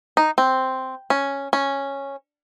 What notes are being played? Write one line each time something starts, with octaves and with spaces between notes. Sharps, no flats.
D#4
C4
C#4
C#4